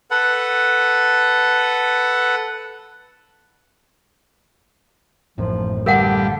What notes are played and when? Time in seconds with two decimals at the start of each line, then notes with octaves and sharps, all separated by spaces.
0.11 A4 B4 F#5
5.38 A1 F#2 A2 F3
5.86 D3 G3 A#4 F5 F#5